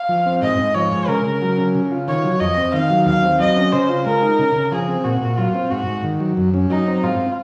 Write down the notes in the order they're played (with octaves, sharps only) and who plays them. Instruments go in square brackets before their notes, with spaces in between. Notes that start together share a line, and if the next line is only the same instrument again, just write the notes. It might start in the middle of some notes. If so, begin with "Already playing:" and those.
Already playing: [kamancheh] F5
[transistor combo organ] F3
C4
[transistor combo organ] G#2 [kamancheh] D#5
[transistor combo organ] G#2
[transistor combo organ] F3 [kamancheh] C#5
[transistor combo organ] G#3
[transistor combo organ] C#3 [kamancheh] A#4
[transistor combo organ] C#3
F#3
C#4
C#3
F4
[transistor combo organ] D#3 [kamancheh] C#5
[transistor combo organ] F#3
[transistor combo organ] F2 [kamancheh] D#5
[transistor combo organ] C4
[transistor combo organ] D#3 [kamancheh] F5
[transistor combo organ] F#3
[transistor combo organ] D#2 [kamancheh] F5
[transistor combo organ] C4
[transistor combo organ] F#3 [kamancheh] D#5
[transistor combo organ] C#4
[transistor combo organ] C#3 [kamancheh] C5
[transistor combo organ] F4
[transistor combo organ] G#3 [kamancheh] A#4
[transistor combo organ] D#4
C#3
C#3
[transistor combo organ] F3 [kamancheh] G#4
[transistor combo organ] C4
[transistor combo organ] A#2 [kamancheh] F#4
[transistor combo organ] A#2
[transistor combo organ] F#3 [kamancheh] F4
[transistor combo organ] C4
[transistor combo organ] G#2 [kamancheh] F#4
[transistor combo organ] G#2
D#3
F#3
F#2
C#4
[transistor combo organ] F#3 [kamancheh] D#4
[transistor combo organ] C4
[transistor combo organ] G#2 [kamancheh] F4